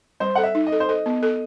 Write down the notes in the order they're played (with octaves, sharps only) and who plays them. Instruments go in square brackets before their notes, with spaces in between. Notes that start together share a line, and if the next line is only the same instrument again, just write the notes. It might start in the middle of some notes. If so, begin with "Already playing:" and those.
[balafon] G3 [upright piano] C5
[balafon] A4 [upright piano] F#5
[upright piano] E5
[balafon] D#4
[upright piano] D#5
[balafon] A4
[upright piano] C5
[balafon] A4 [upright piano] D#5
[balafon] B3
A4